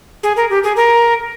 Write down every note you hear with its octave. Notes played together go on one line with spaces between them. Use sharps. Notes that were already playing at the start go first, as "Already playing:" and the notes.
G#4
A#4
G4
G#4
A#4